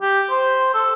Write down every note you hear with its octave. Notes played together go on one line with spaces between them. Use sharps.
G4
C5
A4